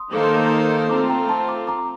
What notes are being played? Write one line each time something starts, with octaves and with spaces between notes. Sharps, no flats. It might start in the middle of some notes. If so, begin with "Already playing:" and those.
Already playing: C6 D#6
D#3 A#3 D#4 A4 C5 D6
C6
A#5 D6
A3 C4 F4 A4 A#5 D6
G5 A#5
A5 C6
A#5 D6
A#5 D6